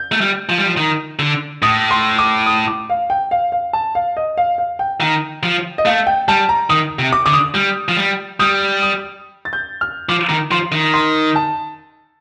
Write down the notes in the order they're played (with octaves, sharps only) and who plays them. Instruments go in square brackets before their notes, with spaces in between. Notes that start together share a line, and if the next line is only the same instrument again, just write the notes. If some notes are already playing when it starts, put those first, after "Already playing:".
Already playing: [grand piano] G6
[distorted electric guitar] A3
G3
F3
G3
F3
D#3
D3
[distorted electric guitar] A2 [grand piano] D#6
[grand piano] C6
D6
D#6
D6
F5
G5
F5
F5
A5
F5
D#5
F5
F5
G5
[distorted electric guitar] D#3
F3
[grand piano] D#5
[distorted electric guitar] A3 [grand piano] F5
[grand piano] G5
[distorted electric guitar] G3 [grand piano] A5
[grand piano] A#5
[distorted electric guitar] D#3 [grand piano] D#6
[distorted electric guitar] C3
[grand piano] D6
[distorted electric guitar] D3 [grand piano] D6
[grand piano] D#6
[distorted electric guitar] G3
F3
G3
[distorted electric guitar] G3 [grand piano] D#6
[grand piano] D#6
A6
G6
F6
[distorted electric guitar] F3 [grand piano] D6
[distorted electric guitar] D#3
[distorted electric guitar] F3 [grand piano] C6
[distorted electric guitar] D#3
[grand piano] C6
A5